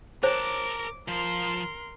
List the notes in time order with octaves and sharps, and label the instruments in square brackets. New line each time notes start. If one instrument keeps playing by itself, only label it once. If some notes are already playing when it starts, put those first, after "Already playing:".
[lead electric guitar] A#4 A5 [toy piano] C5 C#5 [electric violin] D6
[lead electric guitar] F3 [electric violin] A#4 C6